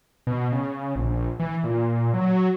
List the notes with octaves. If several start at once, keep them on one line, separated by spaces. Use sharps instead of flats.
B2
C#3
A#1
E3
A#2
F#3